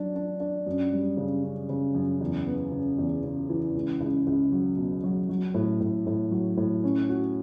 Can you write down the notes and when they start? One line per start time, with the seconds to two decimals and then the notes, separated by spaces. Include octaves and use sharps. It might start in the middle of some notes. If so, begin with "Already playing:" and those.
Already playing: F#3 D4
0.16 D4
0.40 D4
0.66 F#2
0.93 G3
1.17 C#3
1.43 C#4
1.69 C#3
1.95 F#2
2.21 E2
2.47 B3
2.71 C#3
2.98 E2
3.24 C#3
3.49 E3
3.75 C#2
4.00 C#2
4.27 C#2
4.52 F#3
4.77 B2
5.04 F#3
5.29 F#3
5.54 A2
5.80 A2
6.07 A2
6.31 F#3
6.57 A2
6.84 C#4
7.09 F#4